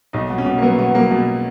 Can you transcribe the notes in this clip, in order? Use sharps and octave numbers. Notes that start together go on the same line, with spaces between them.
B1 D#4
B2
C#4
B2
A#3
F#3 B3
B2 B3
F#3 A#3
B2